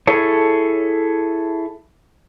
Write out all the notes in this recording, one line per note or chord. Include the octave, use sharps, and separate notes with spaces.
E4 G#4 A4 C#5